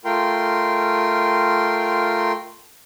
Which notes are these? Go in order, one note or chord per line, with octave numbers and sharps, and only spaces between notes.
A3 F4 A#4 G5 C6